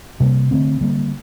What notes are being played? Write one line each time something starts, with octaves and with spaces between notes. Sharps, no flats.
C3 G3 A#3
D3 A3 C4
D3 G3 A#3